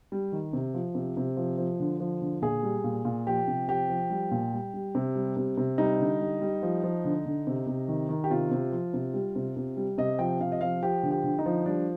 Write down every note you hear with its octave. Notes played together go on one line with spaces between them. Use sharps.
G3
D#3
C3
F3
C3
C3
F3
F3
D3
F3
D3
A#2 G#4
G3
A#2
A#2
F3 G4
C3
F3 G4
F3
G3
A#2
G3
G3
C3
G3
C3
C3
G3 D#4
D3
G3
G3
F3
F3
D3
D3
C3
C3
D#3
D#3
G4
C3 F4
C3
F3
C3
G3
C3
C3
G3
C3 D#5
F3 G5
C3 F5
D#5
F3 F5
F3 G4
D3
G4
D3
D#4
F3
G3 D4